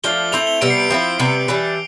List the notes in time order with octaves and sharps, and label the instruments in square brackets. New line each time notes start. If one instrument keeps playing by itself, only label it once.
[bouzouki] F3 A3 D4 F4 [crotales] G7
[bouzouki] A3 C4 E4 [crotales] F7
[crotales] G7
[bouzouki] C3 G3 B3 [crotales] D7
[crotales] C7
D7
[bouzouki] F3 C4 E4 [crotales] C7
[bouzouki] C3 G3 B3
E3 G3 D4